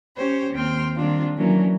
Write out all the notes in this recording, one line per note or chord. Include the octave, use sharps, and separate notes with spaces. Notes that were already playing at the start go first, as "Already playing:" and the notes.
C#4 G4 C5 C#5
D#2 C4 G5 C6 F6
D#3 G3 A#3 C4 D4 F4
E3 F#3 A#3 C#4 D4